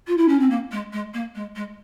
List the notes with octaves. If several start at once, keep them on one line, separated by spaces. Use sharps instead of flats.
F4
E4
C#4
C4
A#3
G#3
G#3
A#3
G#3
G#3